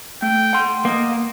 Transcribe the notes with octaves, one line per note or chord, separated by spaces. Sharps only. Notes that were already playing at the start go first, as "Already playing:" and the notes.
A3 G5
F#5 C6
A#3 D#5